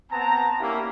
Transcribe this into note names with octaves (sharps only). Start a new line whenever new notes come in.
B3 C4 A5 A#5
A#3 C#4 D4 E4 G4 E5